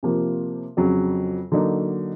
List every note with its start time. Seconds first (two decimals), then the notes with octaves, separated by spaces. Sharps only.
0.03 C3 F3 A#3
0.77 F2 C#3 F#3
1.52 D3 F#3 A#3 D#4